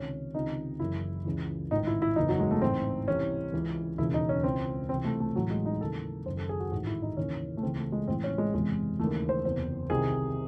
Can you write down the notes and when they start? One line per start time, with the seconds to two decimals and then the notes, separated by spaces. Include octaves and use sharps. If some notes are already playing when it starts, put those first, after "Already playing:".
Already playing: C#2 C3 D#3 C#4
0.34 C#2 C3 D#3 D#4
0.80 F#1 F#2 C#3 E3 E4
1.25 C#2 C#3 E3
1.71 A1 G#2 D#3 D#4
1.87 E4
2.02 E4
2.16 F#1 E2 C#3 E3 D#4
2.29 F#3
2.40 G#3
2.51 A3
2.62 A1 G#2 E3 C4
3.08 C2 C3 E3 C#4
3.53 C#2 C#3 E3
3.98 E1 D#2 C#3 E3 E4
4.14 D#4
4.29 C#4
4.43 C#2 C#3 E3 C4
4.89 C2 C3 E3 C4
5.04 A3
5.20 A3
5.35 A1 A2 E3 F#3
5.50 G#3
5.66 D#4
5.81 D#2 C#3 E3 A4
6.26 F#1 F#2 D#3 C5
6.37 A4
6.49 G#4
6.60 F#4
6.72 A1 G#2 D#3 F#4
6.87 E4
7.02 D#4
7.17 D#2 C#3 E3 C#4
7.57 A3
7.63 C#2 C#3 E3 C4
7.78 A3
7.92 G#3
8.08 A1 A2 E3 C4
8.24 C#4
8.38 G#3
8.53 F#1 E2 C3 E3 G#3
8.99 D#2 C#3 E3 A3
9.29 C5
9.45 F#1 E2 C3 C5
9.90 C2 C3 D#3 G#4